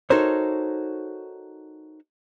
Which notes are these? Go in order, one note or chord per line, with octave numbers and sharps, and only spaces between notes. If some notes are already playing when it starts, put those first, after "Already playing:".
D#4 F#4 A4 A#4 C5 C#5